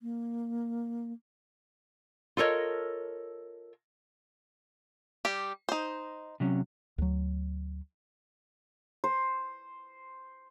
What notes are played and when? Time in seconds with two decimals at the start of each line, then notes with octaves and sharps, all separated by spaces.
0.02 A#3
2.37 F4 A4 A#4 C#5 D#5
5.25 G3 G4
5.69 D#4 C5
6.40 C3 F#3 C#4
6.98 D2 F#3
9.04 C5